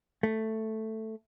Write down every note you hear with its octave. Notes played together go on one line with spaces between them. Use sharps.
A3